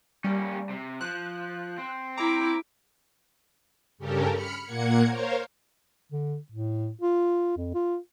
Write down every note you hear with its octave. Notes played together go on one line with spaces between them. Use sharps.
G3 A#3 C#4
C3
F3 F#6
C4
E4 A#5 D6
G2 C#3 C#4 G4 A4 A#4
B5 F6 C#7
A#2 A#3 F#5 G#6 C#7
A#4 C5 C#5 F5
D3
A2
F4
F2
F4